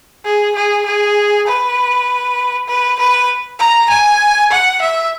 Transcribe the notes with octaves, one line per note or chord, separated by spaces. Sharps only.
G#4
G#4
G#4
B4
B4
B4
A#5
G#5
F#5
E5